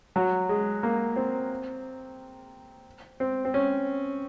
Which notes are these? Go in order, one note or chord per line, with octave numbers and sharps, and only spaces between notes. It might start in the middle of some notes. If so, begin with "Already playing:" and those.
F#3
G#3
A#3
C4
C4
C4
C#4